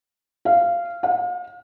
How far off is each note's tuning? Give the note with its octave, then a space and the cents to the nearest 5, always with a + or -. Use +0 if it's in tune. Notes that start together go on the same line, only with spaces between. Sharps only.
F5 -15
F5 +40